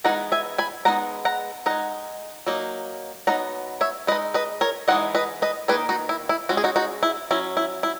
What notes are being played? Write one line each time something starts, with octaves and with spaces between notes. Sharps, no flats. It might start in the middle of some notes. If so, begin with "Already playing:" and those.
E3 G#3 B3 D#4 F#5 A#5
E5 G#5
G#5 B5
G#3 B3 D#4 F#5 A#5
F#5 A#5
G#3 D#4 F#5 A#5
F#3 A#3 D#4
F#3 B3 D#4 F#5 A#5
C#5 E5
G#3 D#4 B4 D#5
B4 D#5
A#4 C#5
E3 G#3 D#4 D#5 F#5
B4 D#5
B4 D#5
D#3 A#3 D#4 G#4 B4
D#4 F#4
E4
E4
G#3 C#4 F#4
G#4
D#4 F#4
D#4 F#4
E4
F#3 C#4 E4
E4
E4